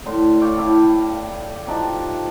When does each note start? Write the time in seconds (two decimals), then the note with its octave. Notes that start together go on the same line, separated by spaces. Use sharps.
0.05 A2 D3 C6
0.41 C#5 D5 F5 G5
0.58 D4 E4 F5 B5
1.13 F5
1.67 F3 D4 D#4 G4